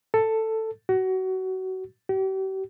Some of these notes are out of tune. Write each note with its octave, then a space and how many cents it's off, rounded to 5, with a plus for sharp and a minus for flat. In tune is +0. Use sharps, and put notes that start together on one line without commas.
A4 +10
F#4 +25
G4 -40